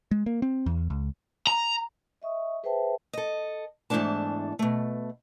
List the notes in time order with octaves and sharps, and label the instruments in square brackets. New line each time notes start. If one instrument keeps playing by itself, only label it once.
[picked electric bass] G#3
A#3
C4
E2
C#2
[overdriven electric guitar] A#5
[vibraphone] D#5 E5 C#6 D#6
G#4 B4 C5 E5 G5 A5
[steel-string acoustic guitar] A4 D#5
E2 G#2 E3 A3 D4 A5
B2 A3